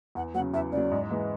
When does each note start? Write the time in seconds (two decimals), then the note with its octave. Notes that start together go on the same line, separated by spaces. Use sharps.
0.15 E2 F#5
0.34 F#3 F#5
0.39 C#3
0.54 E2 E5
0.72 C#3 F#3 D5
0.91 G#2
1.11 E3 G#3